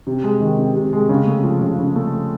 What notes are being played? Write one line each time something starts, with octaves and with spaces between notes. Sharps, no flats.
C3
G#3
D#3
C3
C3
G#3
C#3
A3
F3
C#3
C#3
A3